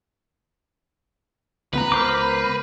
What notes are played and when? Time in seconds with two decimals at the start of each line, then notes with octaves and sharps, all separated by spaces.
1.73 C#2 B3 B4 A#5
1.92 A#4 C5 D6